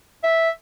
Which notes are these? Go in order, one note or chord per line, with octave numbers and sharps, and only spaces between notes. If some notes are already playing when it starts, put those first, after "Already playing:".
E5